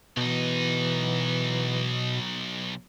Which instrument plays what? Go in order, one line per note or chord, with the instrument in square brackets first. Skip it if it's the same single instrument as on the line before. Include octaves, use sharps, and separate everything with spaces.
[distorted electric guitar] B1 D#4 [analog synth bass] B2 [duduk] E3